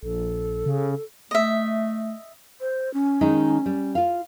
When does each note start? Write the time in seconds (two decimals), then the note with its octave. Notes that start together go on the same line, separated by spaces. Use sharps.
0.03 A#1 A4
0.66 C#3
1.31 A3 D#5 E5
2.61 C5
2.94 C#4
3.21 D#3 G#3 D#4
3.66 G3
3.95 F4 F5